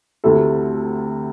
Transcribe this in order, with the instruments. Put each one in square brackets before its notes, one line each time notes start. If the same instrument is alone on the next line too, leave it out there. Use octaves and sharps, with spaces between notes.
[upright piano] D2 C3 A3 E4 A4